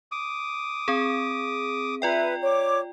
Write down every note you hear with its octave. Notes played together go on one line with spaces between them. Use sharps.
D6 D#6
C4 G#4
F4 B4 D5 E5 G5
C#5 D6